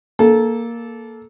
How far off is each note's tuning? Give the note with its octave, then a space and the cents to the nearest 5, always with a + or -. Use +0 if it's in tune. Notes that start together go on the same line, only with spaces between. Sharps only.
A#3 +0 A4 -20